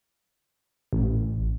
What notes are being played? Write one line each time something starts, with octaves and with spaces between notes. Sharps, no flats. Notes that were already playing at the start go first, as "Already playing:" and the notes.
A1